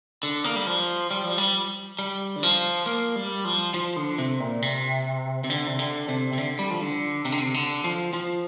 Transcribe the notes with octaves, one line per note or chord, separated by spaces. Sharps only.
D3
A#3
G3
F3
G3
F3
G3
G3
D3
F3
A#3
G3
F3
F3
D3
C3
A#2
C3
C3
D3
C3
D3
C3
C3
D3
G3
F3
D3
C3
D3
C3
D3
F3
F3